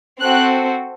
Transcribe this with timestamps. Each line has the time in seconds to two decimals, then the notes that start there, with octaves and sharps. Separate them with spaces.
0.20 C4 F#4 A4 F#6